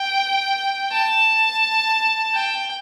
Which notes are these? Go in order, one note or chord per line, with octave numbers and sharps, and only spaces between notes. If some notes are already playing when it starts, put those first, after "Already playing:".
Already playing: G5
A5
G5